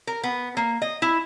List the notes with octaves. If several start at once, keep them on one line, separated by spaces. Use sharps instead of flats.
A#4
B3
A#3
D#5
E4